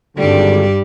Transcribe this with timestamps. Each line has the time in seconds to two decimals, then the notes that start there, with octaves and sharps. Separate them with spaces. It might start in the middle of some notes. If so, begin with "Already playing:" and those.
0.17 G#1 G2 D3 G3 G4 D5